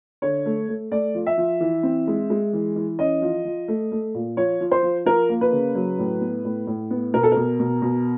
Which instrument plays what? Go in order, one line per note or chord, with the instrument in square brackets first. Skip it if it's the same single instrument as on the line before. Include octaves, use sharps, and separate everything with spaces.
[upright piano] D3 C#5
A3
A3
A3 D5
F3
E5
F3
E3
C4
G#3
G#3
E3
E3
C#4 D#5
F3
F3
A3
A3
A#2
F3 C#5
F3
C5
F3
F3 A#4
A#3
B4
C#3
F#3
A2
B3
A2
A2
B3
B2 A#4
A4
B2 A#4
B2
B2